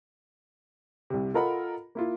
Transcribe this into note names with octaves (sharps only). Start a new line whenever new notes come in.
C2 C3
F4 A4 A#4 D#5 F#5 B5
A#3 E4 F4